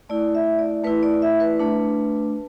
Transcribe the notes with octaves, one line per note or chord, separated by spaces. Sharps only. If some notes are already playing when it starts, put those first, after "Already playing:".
A3 E4 D5
E5
D5
A3 E4 B4
D5
E5
B4
A3 D4